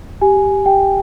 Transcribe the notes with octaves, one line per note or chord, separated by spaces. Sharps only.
G4 G#5
G4
G4
G4 G5
G4